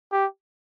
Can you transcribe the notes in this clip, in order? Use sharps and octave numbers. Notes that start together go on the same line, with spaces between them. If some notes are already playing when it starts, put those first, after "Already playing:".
G4